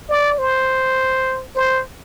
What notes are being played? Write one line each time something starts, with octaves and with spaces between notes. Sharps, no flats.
D5
C5
C5